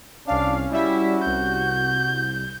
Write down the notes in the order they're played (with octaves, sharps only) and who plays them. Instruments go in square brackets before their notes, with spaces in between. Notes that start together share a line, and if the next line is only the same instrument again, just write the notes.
[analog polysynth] C2 F5 [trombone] C#4 [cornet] D4
[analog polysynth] G3 E5 [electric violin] E4 [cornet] F#4
[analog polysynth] C2 [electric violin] G6